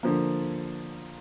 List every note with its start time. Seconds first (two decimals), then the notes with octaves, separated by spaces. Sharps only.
0.03 D3 F3 A#3